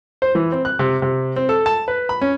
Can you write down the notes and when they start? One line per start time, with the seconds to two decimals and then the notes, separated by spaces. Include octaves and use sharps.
0.22 C5
0.35 E3
0.52 C4
0.65 F#6
0.79 C3
1.02 C3
1.36 C4
1.49 A4
1.66 A5
1.88 B4
2.09 B5
2.21 C#4